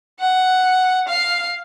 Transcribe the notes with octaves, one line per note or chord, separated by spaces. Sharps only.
F#5
F5